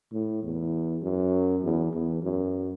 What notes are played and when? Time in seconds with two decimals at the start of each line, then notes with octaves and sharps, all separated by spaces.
0.13 A2
0.43 E2
1.02 F#2
1.63 E2
1.93 E2
2.22 F#2